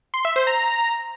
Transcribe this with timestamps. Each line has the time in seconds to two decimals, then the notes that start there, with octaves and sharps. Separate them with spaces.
0.14 C6
0.25 E5
0.36 C5
0.47 A#5